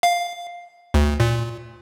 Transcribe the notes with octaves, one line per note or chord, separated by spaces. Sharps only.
F5
D2
A#2